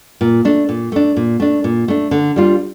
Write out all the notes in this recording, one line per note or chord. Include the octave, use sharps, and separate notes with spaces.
A#2
A3 D4
A#2
A3 D4
A#2
A3 D4
A#2
A3 D4
D3
G3 D4 F4